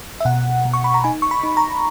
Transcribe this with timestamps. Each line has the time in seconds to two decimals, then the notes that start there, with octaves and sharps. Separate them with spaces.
0.21 E5
0.25 B2 F#5
0.65 B2
0.73 C#6
0.84 B5
0.94 A#5
1.04 D#4 G#5
1.22 C#6
1.31 B5
1.44 D#4
1.57 A#5